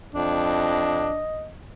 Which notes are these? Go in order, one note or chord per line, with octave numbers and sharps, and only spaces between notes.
F2 D4 D#5